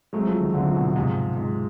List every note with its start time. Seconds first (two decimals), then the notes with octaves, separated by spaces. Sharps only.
0.13 F#3 G#3 A3 C4
0.26 F3
0.40 D#3
0.54 D3 F#3 A3 C4
0.65 F3
0.75 B2
0.86 B2
0.96 G#2 C3 F3 G#3
1.36 G#2 F3 G#3